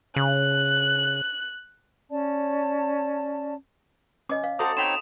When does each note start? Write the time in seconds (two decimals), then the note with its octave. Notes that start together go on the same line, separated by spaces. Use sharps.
0.16 C#3 F#6
2.10 C#4 D5 A5
4.29 C#4 D#5 D6
4.43 F5
4.59 F#4 A4 C5 A#5 D6 D#6
4.77 C4 D#4 C#5 G5 B5 C6 E7 F7